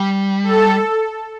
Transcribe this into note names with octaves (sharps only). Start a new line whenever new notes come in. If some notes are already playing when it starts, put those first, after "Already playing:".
Already playing: G3
A4